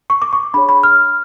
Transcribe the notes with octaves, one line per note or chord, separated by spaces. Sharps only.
C#6
D6
C#6
D4 G#4 C#5 B5
B5
F6